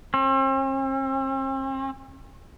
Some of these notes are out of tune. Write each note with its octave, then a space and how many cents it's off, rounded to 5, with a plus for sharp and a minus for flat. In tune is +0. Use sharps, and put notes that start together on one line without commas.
C4 +45